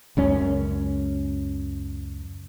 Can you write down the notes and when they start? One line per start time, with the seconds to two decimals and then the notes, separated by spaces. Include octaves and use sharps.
0.17 C#2 F#2 C#4